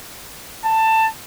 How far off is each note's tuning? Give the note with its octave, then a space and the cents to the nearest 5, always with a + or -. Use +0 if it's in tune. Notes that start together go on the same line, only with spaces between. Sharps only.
A5 +15